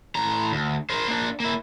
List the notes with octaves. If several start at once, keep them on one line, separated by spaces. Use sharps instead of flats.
A2 A#5
D2
A#4 C5
A#3 D4
A#3 E4